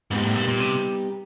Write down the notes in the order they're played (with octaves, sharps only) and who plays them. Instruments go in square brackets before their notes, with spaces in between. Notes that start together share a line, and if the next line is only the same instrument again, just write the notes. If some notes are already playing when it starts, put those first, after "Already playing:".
[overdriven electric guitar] G#2 [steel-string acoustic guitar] G3 B3 D#4 G4
[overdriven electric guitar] A2
A#2
A#2
C3